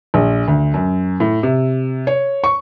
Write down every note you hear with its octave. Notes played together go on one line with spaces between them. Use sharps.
A#1
D2
F#2
A2
C3
C#5
C#6